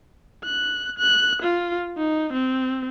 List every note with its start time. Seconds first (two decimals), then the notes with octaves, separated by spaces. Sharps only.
0.44 F#6
0.99 F#6
1.43 F4
1.98 D#4
2.33 C4